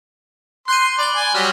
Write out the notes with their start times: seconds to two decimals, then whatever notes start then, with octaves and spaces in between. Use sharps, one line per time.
0.68 C6 F#6 G6 D#7
0.99 D5 B5 G7
1.16 G#5
1.35 F#3 G3 F6